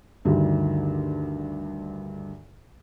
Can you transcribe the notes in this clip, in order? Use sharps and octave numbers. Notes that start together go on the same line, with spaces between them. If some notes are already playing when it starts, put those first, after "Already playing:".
D2 G2 D3 D#3